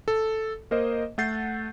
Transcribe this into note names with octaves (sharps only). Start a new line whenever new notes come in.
A4
A#3 A#4 C5 D#5
A3 A4 F#5 G6 A6 C7